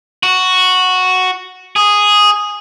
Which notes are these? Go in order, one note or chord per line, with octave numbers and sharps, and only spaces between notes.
F#4
G#4